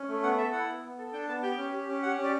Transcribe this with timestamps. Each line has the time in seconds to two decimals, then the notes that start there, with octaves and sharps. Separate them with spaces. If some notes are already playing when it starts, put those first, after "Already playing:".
Already playing: C#4
0.08 A3
0.23 B3 F#5
0.37 A4 E5
0.52 E4 F#5
0.68 B3
0.84 B3
0.98 A4
1.13 D4 G5
1.28 B3 A5
1.42 G4 G5
1.57 C#4
1.73 G4
1.88 C#4
2.02 G4 F#5
2.18 C#4
2.24 D5